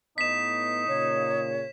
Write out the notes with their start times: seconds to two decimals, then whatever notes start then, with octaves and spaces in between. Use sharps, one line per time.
0.18 A2 B3 D#4 D#5 B6 E7
0.88 A#2 C#3 C#5